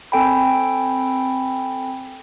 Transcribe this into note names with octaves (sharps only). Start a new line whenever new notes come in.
C4 A4 G5 G#5 B5